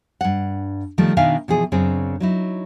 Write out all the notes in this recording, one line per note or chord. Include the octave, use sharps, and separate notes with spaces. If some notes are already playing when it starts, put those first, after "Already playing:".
G2 F#5
D#3 F3 G3 A3
B2 D#3 D4 E5 F5 G#5
B2 E3 F3 G#4
F#2 C#3 C4 D4 G#4
F#3 D#4 E4